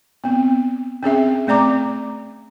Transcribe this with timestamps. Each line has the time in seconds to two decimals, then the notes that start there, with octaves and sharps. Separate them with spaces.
0.24 B3 C4
1.03 C4 C#4 G#4 E5
1.47 A3 C4 D5 A#5 D6